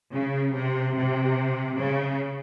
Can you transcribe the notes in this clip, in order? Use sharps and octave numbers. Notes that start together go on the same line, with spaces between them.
C#3
C3
C3
C#3